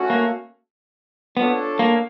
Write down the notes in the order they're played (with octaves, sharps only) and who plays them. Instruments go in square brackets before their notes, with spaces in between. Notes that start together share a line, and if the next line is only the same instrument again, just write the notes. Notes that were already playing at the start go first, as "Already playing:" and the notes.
Already playing: [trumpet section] A3 C#4 F#4
[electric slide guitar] A#3
[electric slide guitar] B3 [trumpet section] D4 F4 A4 C#5
[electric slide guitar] A#3